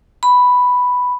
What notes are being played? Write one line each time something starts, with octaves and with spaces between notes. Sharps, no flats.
B5